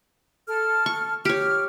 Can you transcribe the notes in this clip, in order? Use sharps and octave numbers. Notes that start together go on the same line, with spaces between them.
A4 F6
C#6
G4 C#5 F6